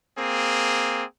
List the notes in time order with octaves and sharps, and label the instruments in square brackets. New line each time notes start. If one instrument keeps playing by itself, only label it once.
[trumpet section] A#3 C4 G#4